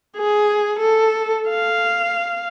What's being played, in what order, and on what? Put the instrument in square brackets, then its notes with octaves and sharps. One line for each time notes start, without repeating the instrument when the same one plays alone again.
[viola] G#4
A4
F5